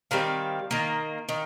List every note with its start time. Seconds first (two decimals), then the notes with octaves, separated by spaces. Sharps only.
0.11 D#3 G3 C4 F5
0.71 D#3 A#3
1.29 D#3